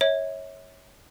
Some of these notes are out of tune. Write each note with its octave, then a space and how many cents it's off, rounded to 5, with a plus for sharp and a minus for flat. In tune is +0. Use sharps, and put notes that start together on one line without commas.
C#5 -10 E5 -35